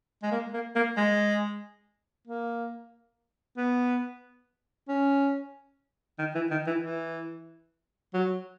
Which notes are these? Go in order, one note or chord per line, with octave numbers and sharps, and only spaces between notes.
G#3
A#3
A#3
A#3
G#3
A#3
B3
C#4
D#3
E3
D#3
E3
E3
F#3